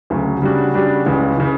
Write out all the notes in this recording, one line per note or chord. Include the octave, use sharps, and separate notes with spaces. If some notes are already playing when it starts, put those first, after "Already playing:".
D2 C#3 F#3 A3
C#3 G3 D4 F#4
C#3 G3 D4 F#4
C#2 C#3 E3
C#3 E3